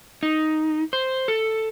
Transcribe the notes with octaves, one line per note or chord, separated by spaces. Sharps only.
D#4
C5
A4